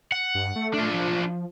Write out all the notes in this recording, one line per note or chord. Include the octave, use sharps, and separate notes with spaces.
F#5
G2
A3
D4 F4
F3